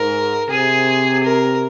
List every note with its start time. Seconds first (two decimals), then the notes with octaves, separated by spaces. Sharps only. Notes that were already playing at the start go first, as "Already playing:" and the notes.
Already playing: G#2 A#4
0.49 C3 G#4
1.24 A#4